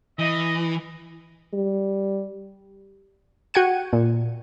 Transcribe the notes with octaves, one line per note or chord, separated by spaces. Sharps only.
E3 D#5
G3
F#4 F#5 G5 G#6 C#7 D#7
A#2